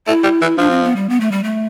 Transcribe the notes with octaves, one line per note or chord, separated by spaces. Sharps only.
A3 E4
G3
E3
F3 D4
C4
B3
G3
B3
A3
G3
A3